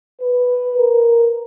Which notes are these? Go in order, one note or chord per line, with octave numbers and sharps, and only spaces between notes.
B4
A#4